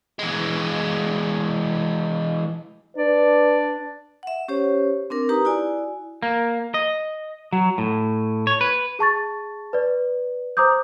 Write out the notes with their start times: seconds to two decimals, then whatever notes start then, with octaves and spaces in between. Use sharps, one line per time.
0.19 E3 G#3
2.97 D4 B4 D5
4.23 E5 F#5
4.48 C#4 G4 C5 C#5
5.10 C4 D4 A#4
5.29 D#4 G4 B4 A#5 D#6
5.45 E4 F#4 D5 G#5
6.22 A#3
6.74 D#5
7.53 F#3
7.78 A2
8.47 C#5
8.61 B4
8.99 G#4 A5 C#6 A6
9.73 B4 D5
10.57 C5 A#5 D6 D#6 G6